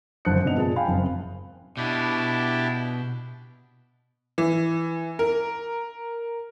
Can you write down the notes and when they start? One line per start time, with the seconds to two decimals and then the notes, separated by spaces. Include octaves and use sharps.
0.25 F#1 D3 C5 A5 F#6 C#7
0.44 G1 C3 B3 D4 D#5 F7
0.56 A#2 G#4 A5
0.76 F5 G5 G#5 B5
0.88 F#1 C4
1.77 B2 D4 E4 G4
4.38 E3
5.19 A#4